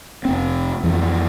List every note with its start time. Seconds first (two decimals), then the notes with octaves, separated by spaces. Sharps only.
0.25 F1 C4
0.83 F2 E3